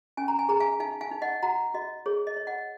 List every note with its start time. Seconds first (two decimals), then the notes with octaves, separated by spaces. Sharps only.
0.17 C#4 G#5
0.28 A#5
0.39 G#5
0.49 G#4 A#5
0.60 F5 G#5
0.80 D#4 F5 G#5
1.01 F5 G#5
1.11 D#4
1.22 D#5 F#5
1.43 F#4 F#5 A#5
1.74 F#4 D#5
2.06 G#4 C#5
2.27 D#5
2.36 C#5
2.47 D#5 F#5